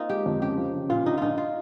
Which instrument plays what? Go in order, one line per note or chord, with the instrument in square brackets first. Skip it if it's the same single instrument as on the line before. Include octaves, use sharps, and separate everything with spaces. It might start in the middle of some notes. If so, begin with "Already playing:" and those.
Already playing: [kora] A#3 C4 D#4 F4
[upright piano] G#3 [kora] G4
[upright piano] F2
[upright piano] C#3 [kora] G4
[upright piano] F3
C#3
[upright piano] A#2 [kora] F4
[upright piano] A#1 [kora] D#4
[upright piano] A#1 [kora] D#4 F4
[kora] F4